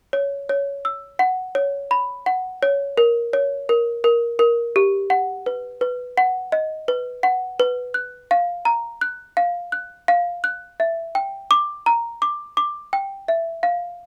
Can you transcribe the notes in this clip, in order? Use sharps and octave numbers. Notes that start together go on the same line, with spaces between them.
C#5
C#5
E6
F#5
C#5
B5
F#5
C#5
A#4
C#5
A#4
A#4
A#4
G4
F#5
B4
B4
F#5
D#5
B4
F#5
B4
F#6
F5
A#5
F#6
F5
F#6
F5
F#6
E5
G5
D6
A#5
D6
D6
G5
E5
F5